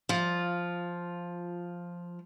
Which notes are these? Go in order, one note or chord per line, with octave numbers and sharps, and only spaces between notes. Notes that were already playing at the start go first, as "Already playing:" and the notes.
F3 F4